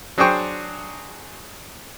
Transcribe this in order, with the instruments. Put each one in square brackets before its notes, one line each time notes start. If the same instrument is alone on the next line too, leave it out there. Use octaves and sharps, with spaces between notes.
[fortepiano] F#3 D4 G#4 C5 G5 C#6